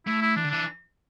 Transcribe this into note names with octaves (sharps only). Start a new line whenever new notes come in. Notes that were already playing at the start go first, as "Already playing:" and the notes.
A3 E4
E4
E3 D4
D3
E3 D4